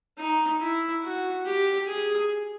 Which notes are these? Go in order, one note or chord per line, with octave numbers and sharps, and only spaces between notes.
D#4
E4
F#4
G4
G#4